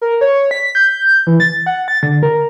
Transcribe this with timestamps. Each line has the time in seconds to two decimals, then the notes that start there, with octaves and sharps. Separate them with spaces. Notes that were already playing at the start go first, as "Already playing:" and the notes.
0.01 A#4
0.21 C#5
0.51 B6
0.75 G6
1.27 E3
1.40 A6
1.66 F#5
1.88 A6
2.03 D3
2.23 A#4